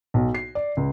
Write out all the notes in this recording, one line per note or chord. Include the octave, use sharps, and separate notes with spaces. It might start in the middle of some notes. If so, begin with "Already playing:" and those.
B1
C7
D5
C#2